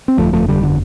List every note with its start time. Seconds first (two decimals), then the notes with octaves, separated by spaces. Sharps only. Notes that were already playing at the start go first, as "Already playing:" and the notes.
0.08 C4
0.17 G1 F2 D3 F3 A3
0.33 F3 A3
0.48 D3 G3
0.63 D3